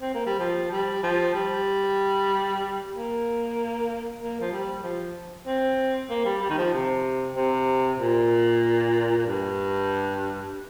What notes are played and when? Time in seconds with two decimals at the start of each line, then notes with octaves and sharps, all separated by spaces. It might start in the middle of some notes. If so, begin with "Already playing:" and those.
0.01 C4
0.14 A#3
0.26 G3
0.39 F3
0.71 G3
1.03 F3
1.34 G3
2.93 A#3
4.20 A#3
4.41 F3
4.51 G3
4.83 F3
5.47 C4
6.10 A#3
6.25 G3
6.42 G3
6.50 D#3
6.58 F3
6.73 C3
7.36 C3
8.00 A#2
9.18 A#2
9.27 G2